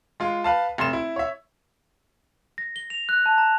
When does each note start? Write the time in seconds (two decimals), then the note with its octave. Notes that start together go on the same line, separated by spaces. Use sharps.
0.20 G#3 F4
0.44 B4 F5 A5
0.78 F1 C6 E7
0.93 E4
1.16 C#5 E5
2.58 A#6
2.76 G7
2.90 F7
3.09 F#6
3.26 A5
3.38 A#5